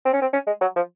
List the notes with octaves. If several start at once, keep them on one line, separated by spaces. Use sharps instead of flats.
C4
C#4
C4
C#4
G#3
F#3
F3